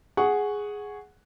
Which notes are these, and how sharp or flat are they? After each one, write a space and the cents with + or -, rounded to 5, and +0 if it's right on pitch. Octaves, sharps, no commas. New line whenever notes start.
G#4 +0 F#5 +0 C#6 +0